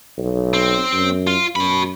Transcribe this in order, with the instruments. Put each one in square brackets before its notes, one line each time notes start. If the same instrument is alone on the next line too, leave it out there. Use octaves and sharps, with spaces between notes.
[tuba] B1
[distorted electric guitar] C4
[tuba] F#2
[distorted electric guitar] F4
[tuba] F#2 [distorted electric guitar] F#4 B5